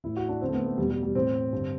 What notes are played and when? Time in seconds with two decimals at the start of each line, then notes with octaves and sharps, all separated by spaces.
0.04 A2 E3 E4
0.16 F#4
0.29 D4
0.41 F#2 D3 C4
0.49 A3
0.53 B3
0.66 A3
0.78 E2 G3
0.81 B2
0.90 G3
1.03 G3
1.15 A2 E3 C4
1.53 G2 D3